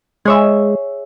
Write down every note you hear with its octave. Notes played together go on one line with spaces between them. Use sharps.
G#3 G#4 C#5 E5